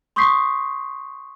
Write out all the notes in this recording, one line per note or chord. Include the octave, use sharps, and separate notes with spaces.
C6 C#6 D#6 G6 B6 C7